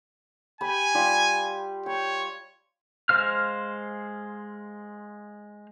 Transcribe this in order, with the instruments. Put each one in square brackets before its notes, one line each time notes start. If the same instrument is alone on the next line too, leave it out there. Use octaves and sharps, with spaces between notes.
[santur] G4 B5 [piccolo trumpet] G#5
[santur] G3 F4 G4
[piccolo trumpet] C#5 [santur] G5
[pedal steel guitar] G#3 C5 F5 F6